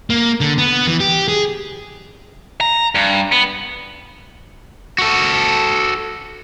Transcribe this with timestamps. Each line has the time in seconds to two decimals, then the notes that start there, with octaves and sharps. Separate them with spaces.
0.10 A#3
0.41 D3
0.58 B3
0.87 E3
1.00 G4
1.28 G#4
2.61 A#5
2.95 G2
3.32 B3
4.98 F#4 A4